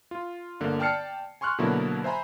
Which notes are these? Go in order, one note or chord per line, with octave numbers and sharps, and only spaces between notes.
F4
G1 D3 A#3
D5 G5 A5 F6 C7 C#7
G#5 C6 C#6 F6 F#6
B2 D3 F#3 A#3 E4
C5 E5 G#5 A#5 B5